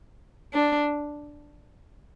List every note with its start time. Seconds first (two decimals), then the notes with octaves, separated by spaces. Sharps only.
0.54 D4